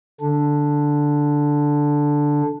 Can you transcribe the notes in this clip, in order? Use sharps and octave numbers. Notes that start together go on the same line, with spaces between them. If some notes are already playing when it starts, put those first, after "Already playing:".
D3 D4